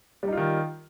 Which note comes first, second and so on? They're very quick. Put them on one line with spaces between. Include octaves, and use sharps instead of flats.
G3 D#4 F4 D#3